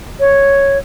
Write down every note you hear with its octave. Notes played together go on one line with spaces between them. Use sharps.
C#5